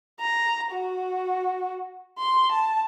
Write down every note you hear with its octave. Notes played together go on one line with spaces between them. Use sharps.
A#5
F#4
C6
A5